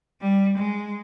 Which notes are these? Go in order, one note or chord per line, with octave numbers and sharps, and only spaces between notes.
G3
G#3